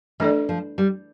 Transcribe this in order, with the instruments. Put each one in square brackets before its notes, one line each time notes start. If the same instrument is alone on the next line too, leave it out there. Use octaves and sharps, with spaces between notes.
[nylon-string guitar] E3 [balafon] A3 D4 A4 D5
[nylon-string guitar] F3
G3